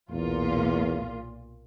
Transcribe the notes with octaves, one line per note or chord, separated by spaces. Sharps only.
B1 E2 A#2 F4